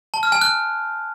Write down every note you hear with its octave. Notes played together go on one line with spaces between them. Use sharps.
A5
F6
G#5
F#6